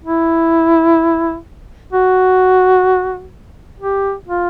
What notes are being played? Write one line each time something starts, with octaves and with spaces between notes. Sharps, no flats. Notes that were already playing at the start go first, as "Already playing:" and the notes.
E4
F#4
G4
F4